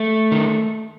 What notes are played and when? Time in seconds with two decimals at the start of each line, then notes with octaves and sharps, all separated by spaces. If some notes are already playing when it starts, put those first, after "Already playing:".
Already playing: A3
0.32 D#3